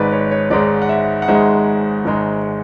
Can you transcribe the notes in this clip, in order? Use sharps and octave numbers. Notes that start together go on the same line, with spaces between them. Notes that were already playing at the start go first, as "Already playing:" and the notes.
Already playing: G#1 G#2 G#3 B4 D5
C#5
C#5
G#1 G#2 G#3 D5
F#5
E5
F#5
G#1 G#2 G#3 E5
G#1 G#2 G#3